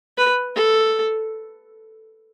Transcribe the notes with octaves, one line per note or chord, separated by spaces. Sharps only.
B4
A4